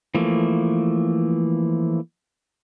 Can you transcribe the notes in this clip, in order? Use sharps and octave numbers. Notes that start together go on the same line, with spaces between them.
E3 F3 A3 A#3